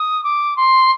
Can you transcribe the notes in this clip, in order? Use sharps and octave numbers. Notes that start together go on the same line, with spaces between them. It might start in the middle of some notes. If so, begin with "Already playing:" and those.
Already playing: D#6
D6
C6